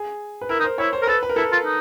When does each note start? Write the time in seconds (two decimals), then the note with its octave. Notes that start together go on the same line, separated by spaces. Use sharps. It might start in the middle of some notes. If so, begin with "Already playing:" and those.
Already playing: G#4
0.41 B4
0.49 E4 A#4
0.59 D#4
0.64 C5
0.78 E4 C#5
0.93 C5
1.02 A#4
1.07 A4 B4
1.23 B4
1.29 A#4
1.36 E4 A4
1.43 A#4
1.52 F4
1.65 D#4